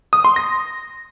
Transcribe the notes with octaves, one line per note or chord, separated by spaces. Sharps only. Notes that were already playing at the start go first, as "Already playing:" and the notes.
D#6
C6
A#6